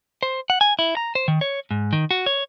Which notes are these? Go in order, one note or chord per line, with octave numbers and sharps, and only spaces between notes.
C5
F#5
G#5
E4
A#5
C5
D#3
C#5
G#2
D#3
F#4
C#5